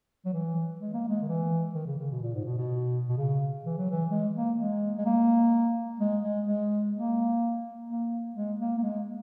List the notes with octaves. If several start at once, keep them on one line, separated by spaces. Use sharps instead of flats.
F#3
E3
G#3
A#3
G#3
D#3
E3
D#3
C#3
C#3
B2
A#2
G#2
B2
B2
B2
C#3
E3
F#3
E3
G#3
A#3
G#3
G#3
A#3
G#3
G#3
G#3
A#3
A#3
G#3
A#3
A#3
G#3